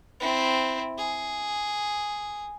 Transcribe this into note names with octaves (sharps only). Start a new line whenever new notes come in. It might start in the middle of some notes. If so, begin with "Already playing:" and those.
C4 E4
G#4